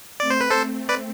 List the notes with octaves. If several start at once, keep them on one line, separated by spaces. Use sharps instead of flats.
A3 C4 D5
C5
B4
A4 C5
B4 D5